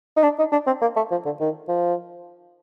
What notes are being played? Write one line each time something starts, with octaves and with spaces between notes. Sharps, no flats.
D#4
D4
D#4
D4
C4
A#3
A3
F3
D3
D#3
F3